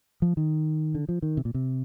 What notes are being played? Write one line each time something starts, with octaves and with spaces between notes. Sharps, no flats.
F3
D#3
D3
F3
D#3
C3
A#2
C3